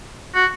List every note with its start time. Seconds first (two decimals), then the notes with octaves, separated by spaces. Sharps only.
0.35 F#4